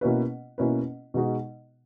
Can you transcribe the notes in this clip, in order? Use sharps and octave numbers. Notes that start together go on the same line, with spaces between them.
B2 A#3 C#4 E4 B4
B2 A#3 C#4 E4 B4
B2 G#3 D#4 F#4